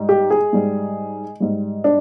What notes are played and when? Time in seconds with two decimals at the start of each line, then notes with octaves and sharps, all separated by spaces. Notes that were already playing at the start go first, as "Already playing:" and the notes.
Already playing: G#2 G3
0.09 G4
0.31 G#4
0.53 G#2 G3
1.40 G#2 G3
1.84 D4